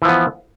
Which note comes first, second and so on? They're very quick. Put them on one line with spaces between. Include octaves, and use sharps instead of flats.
E3 F3 B3